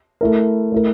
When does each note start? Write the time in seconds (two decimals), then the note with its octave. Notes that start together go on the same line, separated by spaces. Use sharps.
0.21 A3 E4 A#4
0.72 A3 E4 A#4